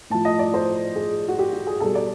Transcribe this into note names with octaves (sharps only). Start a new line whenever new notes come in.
A2 F3 A5
D#5
D5
C5
G#4
F#4
G4
F#4
G#4
B2 G3 A4
D5